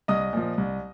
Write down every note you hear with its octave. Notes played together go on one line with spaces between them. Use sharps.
C2 D#5 D#6
A#2 F3
C2